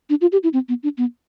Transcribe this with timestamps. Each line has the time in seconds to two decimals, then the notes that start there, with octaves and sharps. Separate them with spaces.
0.10 D4
0.21 F4
0.32 G4
0.43 E4
0.53 C4
0.69 B3
0.83 D4
0.98 B3